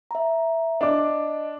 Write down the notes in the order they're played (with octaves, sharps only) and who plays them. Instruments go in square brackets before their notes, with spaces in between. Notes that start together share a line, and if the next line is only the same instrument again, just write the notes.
[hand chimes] E5 A#5
[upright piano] D4 D6 [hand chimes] D#5